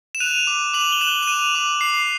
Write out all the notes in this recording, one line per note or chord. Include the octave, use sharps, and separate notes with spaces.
E7
F#6 D#7 F7
D6
D6 E7 F#7
G7
F#6 E7 F#7
E7
F#6 D#7 F7
D6
D6 C7